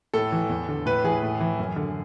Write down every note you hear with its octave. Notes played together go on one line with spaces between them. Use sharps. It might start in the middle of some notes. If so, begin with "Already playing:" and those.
A2 A4
E3
E2
D3
A2 B4
E3 G#4
A2
E3
F#2
D3